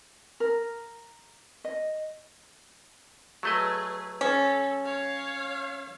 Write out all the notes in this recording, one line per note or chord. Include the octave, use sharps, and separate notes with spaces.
A#4
D#5
F#3 A3 G#4 B4 D#5
C#4 A4
C#5 F5